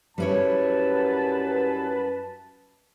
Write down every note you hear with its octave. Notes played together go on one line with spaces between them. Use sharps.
F#2 G3 E4 B4 C#5 A5